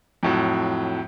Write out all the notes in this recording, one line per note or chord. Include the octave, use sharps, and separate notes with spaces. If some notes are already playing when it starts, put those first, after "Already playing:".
F2 A2 F#3